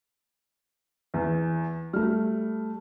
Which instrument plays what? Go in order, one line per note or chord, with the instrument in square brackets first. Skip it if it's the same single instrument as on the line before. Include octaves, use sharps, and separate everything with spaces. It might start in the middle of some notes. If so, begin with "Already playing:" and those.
[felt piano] E2
[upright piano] G3 A3 [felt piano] F6